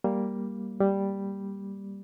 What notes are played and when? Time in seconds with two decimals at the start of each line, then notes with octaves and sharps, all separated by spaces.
0.04 G3 A#3
0.80 G3